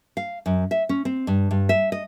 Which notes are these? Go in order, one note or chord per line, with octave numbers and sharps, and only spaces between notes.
F5
F#2
E5
C#4
C4
G2
G2
E5
D#5